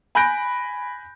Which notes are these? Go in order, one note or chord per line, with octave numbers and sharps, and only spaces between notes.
G#5 B5 F#6 G6 A#6 D7